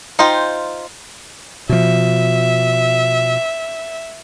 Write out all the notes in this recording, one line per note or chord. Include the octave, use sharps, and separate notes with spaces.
D#4 F4 C5 G5
B2 F3 E5